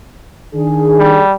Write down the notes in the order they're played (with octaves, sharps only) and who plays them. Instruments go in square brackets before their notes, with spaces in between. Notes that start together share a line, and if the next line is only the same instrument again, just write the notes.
[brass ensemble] D#3 D4 G#4
[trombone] G3